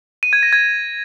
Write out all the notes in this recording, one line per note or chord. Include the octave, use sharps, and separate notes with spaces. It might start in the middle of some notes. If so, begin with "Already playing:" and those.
D#7
G#6
A#6
G#6